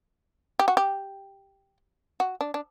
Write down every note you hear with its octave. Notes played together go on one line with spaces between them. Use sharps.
G4
F#4
G4
F#4
D4
D4